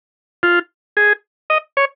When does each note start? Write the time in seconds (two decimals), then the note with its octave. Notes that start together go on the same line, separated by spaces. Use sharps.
0.43 F4
0.97 G#4
1.50 D#5
1.77 C#5